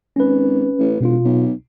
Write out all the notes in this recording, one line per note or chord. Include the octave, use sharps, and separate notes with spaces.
G#1 C#4 B4
A1
E1 B2 F4
B1